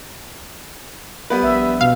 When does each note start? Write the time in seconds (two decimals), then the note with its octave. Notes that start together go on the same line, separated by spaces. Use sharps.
1.30 G3 B3 B4
1.43 A#1 E5
1.81 B2 F5